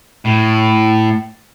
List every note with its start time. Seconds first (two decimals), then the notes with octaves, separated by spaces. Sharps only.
0.25 A2